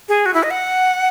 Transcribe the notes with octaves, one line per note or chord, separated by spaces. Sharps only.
G#4
F#4
E4
D#5
F#5